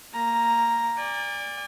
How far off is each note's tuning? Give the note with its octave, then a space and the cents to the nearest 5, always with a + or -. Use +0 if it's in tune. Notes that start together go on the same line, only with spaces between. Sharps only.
A#3 -15 A#5 +0
D5 +0 G#5 -40